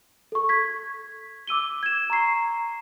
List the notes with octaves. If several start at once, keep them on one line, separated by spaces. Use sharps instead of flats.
A4 C#6
G#6 B6
D6 E6 D#7 G7
G#6 E7
A#5 C#6 C7